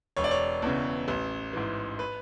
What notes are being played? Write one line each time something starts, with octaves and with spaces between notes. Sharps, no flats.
E1 C#5
D5
C#5
E2 C#3
A1
G#2 E3
B4